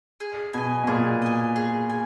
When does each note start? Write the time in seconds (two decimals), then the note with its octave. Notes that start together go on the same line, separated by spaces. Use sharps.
0.20 G#4
0.53 B2 D#5 G#5
0.84 B2
0.87 A#2 G#4
1.22 D#5 G#5
1.56 G#4
1.90 G#5